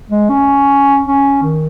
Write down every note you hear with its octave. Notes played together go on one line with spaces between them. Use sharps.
G#3
C#4
C#4
D#3